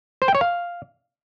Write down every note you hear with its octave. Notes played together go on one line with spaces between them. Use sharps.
C5
G5
C#5
F5